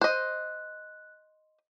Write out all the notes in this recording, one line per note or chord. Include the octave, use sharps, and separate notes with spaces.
C5 D#5 F#6